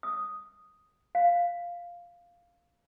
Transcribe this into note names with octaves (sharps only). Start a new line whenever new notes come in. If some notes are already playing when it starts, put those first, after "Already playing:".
D#6
F5